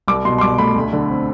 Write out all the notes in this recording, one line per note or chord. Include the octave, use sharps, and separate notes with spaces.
C2 D6
B2 C6
C6
C2 D6
A3 B5
D2
D3
C4